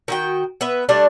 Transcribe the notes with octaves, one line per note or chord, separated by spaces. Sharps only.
D#3 F#4 G5
B3 B4 E5
G3 A3 D4 D5